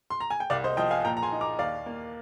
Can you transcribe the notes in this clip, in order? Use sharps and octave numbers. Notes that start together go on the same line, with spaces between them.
C6
A#5
G#5
G5
C2 D5 F5
C5 D#5
F3 D#5 G5
F5 G#5
A#2 G5 A#5
A#5
G#5 C6
D#4
A#5 D6
D#2 D5 F5
A#3